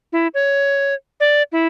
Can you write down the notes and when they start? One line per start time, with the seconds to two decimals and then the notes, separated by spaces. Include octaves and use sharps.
0.13 E4
0.34 C#5
1.20 D5
1.52 E4